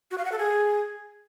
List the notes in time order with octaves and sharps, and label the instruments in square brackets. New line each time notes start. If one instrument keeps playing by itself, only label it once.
[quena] F#4
F5
F#5
A4
G#4